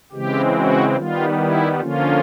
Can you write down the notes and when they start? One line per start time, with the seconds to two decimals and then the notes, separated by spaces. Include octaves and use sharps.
0.12 C#3 E3 G#3 C4 G4
0.55 F#4
0.96 D#3 G3 B3 F4
1.39 E4
1.81 D3 F3 A#3 C#4 F4